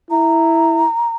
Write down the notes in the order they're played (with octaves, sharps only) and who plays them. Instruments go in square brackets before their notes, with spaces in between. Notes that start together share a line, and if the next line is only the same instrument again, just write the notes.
[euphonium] E4 [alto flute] A#5